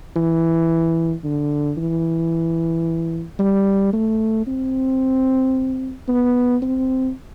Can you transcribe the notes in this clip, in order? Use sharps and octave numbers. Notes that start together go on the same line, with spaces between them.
E3
D3
E3
G3
A3
C4
B3
C4